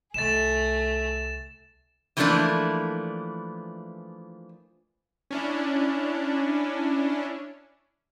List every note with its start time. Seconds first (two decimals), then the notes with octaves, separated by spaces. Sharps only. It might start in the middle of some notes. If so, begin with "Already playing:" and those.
0.14 C2 A3 G#4 A6 E7
2.17 E3 F3 A3 A#3 D4 E4
5.31 C#4 D4 E4